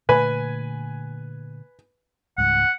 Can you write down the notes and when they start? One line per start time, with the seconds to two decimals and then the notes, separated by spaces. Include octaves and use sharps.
0.09 A#2 D3 A3 B4 G#5 B5
2.38 C#2 G#2 G3 F#5